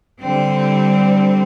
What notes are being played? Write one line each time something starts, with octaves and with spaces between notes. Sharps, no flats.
D3 G3 C4